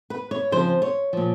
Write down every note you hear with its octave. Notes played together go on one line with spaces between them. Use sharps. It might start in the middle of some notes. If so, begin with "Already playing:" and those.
B4
C#5
F2 C#3 F3 C5
C#5
A#2 F3